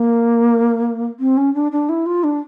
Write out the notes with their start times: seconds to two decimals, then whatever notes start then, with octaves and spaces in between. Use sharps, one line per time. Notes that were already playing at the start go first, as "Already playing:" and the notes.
Already playing: A#3
1.20 C4
1.37 C#4
1.54 D4
1.72 D4
1.89 E4
2.06 F4
2.24 D4